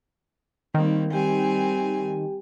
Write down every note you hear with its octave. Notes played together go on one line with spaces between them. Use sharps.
D#3 G3 A#3 C4
G3 C4 G4 G5 G#5